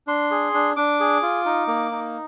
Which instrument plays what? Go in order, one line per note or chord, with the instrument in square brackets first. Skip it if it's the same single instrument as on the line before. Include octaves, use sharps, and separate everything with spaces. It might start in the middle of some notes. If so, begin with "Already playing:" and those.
[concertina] D4 C6
G#4
D4
D4 D6
G#4
F4
D#4
A#3
D#4